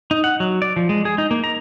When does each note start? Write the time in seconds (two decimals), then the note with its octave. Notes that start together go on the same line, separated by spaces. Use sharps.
0.11 D#4
0.24 F#5
0.40 F#3
0.62 D5
0.76 F3
0.89 G#3
1.05 G#4
1.18 D#4
1.31 A#3
1.44 A#5